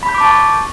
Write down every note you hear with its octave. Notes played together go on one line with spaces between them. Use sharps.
B5
G6
D6
A5
C#6